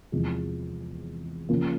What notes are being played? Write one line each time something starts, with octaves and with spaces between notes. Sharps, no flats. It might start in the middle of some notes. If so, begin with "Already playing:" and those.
E2 C3 F3 G#3
C#3 F3 A#3